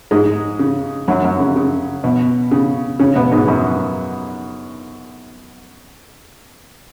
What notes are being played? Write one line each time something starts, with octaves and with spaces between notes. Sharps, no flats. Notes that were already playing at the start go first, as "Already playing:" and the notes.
G#2 G#3
C#3
F#2 F#3
F#2 F#3
C#3
C#3
B2
C#3
C#3 C#4
B2 B3
G#2 G#3
F#2 F#3